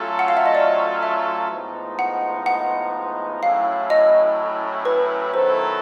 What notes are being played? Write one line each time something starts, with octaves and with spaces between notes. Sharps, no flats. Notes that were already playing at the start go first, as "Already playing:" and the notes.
Already playing: F#3 A3 C#4 F4 A4
F#5
F5
E5
D#5
D5
E5
A2 F3 G#3 B3 D#4
F#5
F#5
A2 F#3 A3 C#4 E4 F5
D#5
B4
D#3 F#3 B3 E4 A4 C5